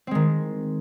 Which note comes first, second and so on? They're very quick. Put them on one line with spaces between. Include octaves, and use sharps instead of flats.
C4 G#3 D#3